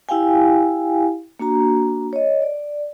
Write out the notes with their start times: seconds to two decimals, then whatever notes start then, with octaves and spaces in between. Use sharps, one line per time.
0.09 E4 G4 F5 G5 G#5
1.40 A#3 D4 F#4 A#5
2.13 C#5 D#5
2.42 D5